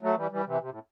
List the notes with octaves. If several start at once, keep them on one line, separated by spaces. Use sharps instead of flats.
F#3 A3
E3 G3
E3 G3
C3 E3
C3
A2